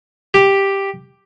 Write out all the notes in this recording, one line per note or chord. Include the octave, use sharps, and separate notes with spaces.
G4